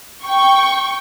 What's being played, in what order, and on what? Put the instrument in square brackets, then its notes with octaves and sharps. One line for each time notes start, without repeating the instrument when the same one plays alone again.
[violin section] G5 C#6